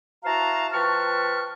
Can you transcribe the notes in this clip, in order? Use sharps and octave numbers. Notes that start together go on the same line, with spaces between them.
E4 F#4 C5 F5 A5 A#5
F3 B4 G5 A5 C#6 F6